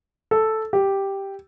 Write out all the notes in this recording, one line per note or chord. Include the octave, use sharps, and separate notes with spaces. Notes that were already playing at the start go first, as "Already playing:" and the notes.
A4
G4